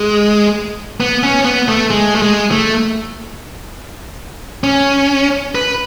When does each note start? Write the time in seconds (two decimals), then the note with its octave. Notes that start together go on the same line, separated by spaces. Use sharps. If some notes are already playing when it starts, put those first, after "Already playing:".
Already playing: G#3
1.00 B3
1.23 C#4
1.45 B3
1.68 A3
1.91 G#3
2.15 A3
2.22 G#3
2.51 A3
4.64 C#4
5.55 B4